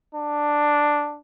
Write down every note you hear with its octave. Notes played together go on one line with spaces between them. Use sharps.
D4